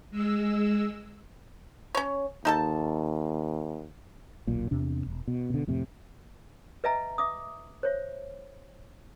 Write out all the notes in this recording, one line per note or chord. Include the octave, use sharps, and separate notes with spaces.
G#3 E6
C#4 C#5
D#2 D#4 A4 A5
D#1 B1 A#2
E2 C3 D4
E1
B2
B2 D3
F2 A2 C3
B4 D#5 E5 G#5 A#5
E5 D6 D#6
C5 C#5 E5